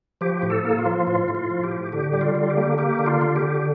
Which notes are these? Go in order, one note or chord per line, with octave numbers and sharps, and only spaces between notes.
F3 G4
A2
A4
A#3
F4
F3
A2 F4
A2
F4
F3
G4
A2
D3 G4
G3
F4
D3
G4
A#3
A#3 G4
D3
F4
D3
G4
D3